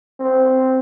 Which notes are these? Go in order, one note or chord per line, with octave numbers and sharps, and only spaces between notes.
C4